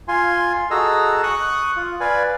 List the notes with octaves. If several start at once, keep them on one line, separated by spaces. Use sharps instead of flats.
F4 G#5 C6
F#4 G#4 A4 D#5 A#5 E6
C#6 D#6 F#6
F4
B4 D5 F5 G#5